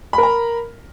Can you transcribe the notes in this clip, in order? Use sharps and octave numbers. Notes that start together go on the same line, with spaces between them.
A#4 A#5 B5